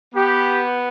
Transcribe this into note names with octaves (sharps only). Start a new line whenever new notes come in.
B3 G4